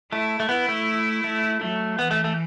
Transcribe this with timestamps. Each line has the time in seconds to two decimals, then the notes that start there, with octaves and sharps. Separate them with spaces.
0.12 A3 E4
0.40 A3
0.49 B3 E4
0.69 A3
1.24 A3
1.61 F#3 A3
1.98 E3 B3
2.11 A3
2.24 A3